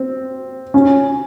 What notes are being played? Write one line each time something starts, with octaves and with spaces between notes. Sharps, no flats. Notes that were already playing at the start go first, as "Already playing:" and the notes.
Already playing: C4
C#4